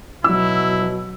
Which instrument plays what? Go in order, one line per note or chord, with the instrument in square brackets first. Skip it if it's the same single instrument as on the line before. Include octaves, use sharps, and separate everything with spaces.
[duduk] B2 [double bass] F#3 [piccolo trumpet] E4 [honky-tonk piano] E6